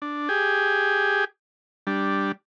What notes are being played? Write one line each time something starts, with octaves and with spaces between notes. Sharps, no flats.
D4
G4 G#4
G3 D4